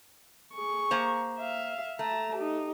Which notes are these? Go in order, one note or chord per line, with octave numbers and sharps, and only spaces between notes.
G#4 C#6
A#3 C5 A#5
E5 F5
A3 A5 A#5
D#4 G4